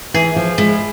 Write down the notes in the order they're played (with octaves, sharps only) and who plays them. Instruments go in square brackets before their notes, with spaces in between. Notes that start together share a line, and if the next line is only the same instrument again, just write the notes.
[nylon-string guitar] E3 [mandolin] G#4
[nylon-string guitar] F3
[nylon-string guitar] F3 G#3 [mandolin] E4